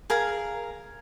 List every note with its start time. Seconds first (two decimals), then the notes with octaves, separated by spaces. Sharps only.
0.10 G#4 A#4 F5 A#5